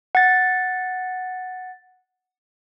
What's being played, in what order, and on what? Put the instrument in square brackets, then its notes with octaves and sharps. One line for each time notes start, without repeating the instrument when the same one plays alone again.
[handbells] F#5 A6